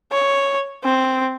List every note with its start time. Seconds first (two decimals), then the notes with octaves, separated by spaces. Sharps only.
0.12 C#5
0.84 C4